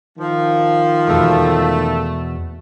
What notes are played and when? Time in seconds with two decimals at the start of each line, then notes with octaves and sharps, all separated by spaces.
0.19 D#3 F3
1.07 E2 B2 G#3 A3